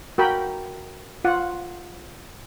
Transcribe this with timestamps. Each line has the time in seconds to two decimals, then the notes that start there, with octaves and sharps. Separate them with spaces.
0.18 F#4 A#4 G5 B5
1.24 F4 F#5